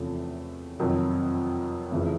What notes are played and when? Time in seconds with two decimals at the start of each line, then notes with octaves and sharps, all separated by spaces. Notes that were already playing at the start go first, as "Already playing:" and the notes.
Already playing: E2 C3 F3 A3 C#4
0.80 F2 C3 D#3 F#3
1.91 F1 F2 C#3 E3